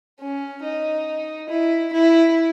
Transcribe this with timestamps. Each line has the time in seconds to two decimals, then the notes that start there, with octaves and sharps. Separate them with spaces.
0.20 C#4
0.63 D#4
1.49 E4
1.92 E4